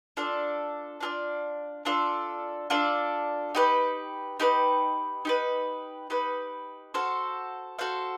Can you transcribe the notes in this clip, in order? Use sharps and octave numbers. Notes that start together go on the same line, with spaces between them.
D4 F4 A4 D5
D4 F4 A4 D5
D4 F4 A4 D5
D4 F4 A4 D5
D#4 G4 B4
D#4 G4 B4
D#4 G4 B4
D#4 G4 B4
F#4 A4 C5 F5
F#4 A4 C5 F5